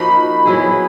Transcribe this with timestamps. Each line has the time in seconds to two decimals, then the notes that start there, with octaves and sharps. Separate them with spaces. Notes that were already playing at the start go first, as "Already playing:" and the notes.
Already playing: F3 A#3 D#4 F#4 B5
0.45 F#3 B3 E4 G#4